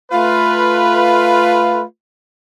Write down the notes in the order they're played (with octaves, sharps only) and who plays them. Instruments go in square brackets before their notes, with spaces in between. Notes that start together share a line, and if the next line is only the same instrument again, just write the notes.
[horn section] A3 F4 B4